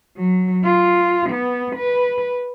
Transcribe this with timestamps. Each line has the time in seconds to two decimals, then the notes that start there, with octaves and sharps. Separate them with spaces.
0.17 F#3
0.64 F4
1.30 B3
1.76 B4